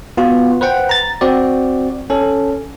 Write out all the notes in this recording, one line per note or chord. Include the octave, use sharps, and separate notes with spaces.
B3 F4 F#4
B4 C5 F#5 G5
A#5 A6
C4 F#4 D5
C#4 A4